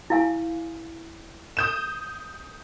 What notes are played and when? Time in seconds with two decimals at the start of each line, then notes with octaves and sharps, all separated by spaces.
0.10 E4 F5 G#5
1.57 D#6 G6 E7